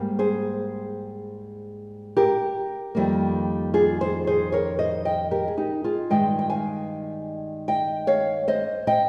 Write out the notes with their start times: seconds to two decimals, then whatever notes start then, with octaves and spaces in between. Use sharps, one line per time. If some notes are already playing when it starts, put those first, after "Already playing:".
Already playing: G#2 G3 A#3
0.19 G#4 C5
2.17 G4 A#4
2.95 F2 D#3 G3 A#3
3.74 F4 G#4
4.01 G#4 C5
4.27 G#4 C5
4.52 A#4 C#5
4.79 C5 D#5
5.05 D#5 G5
5.31 G4 A#4
5.48 G#4
5.57 D#4 G4
5.84 F4 G#4
6.10 G2 D#3 G#3 D#5 G5
6.39 G5
6.50 F5 G#5
7.68 D#5 G5
8.07 C#5 F5
8.48 C5 D#5
8.87 D#5 G5